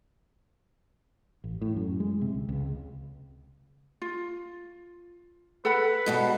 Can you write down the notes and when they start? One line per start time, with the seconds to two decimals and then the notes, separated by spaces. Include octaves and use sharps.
1.44 A1
1.61 A2
1.76 F#2
2.00 G#3
2.21 C3
2.35 C#2
2.49 C#2
4.02 F4
5.65 A4 B4 F#5 B5
6.06 G#2 B2 G3